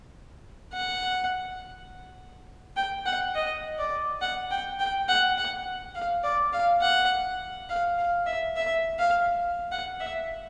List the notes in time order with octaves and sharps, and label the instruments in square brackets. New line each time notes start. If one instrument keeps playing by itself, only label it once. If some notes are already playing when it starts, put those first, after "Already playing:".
[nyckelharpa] F#5
G5
F#5
D#5
D5
F#5
G5
G5
F#5
F#5
F5
D5
F5
F#5
F5
F5
E5
E5
F5
F#5
E5